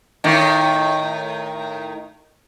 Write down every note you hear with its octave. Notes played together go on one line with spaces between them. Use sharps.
A2 D#3